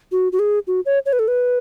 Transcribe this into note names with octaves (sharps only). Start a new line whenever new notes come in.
F#4
F#4
G#4
F#4
C#5
C#5
B4
A4
B4